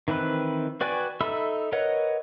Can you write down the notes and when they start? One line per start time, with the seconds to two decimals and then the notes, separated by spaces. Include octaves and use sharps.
0.08 D#3 E3 C4 B4
0.81 F#4 B4 D5 G5 G#5
1.21 D#4 A4 E5 B5 E6
1.72 A#4 B4 C#5 D#5 F#5